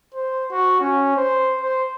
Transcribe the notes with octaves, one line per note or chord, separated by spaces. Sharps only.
C5
F#4
C#4
C5
C5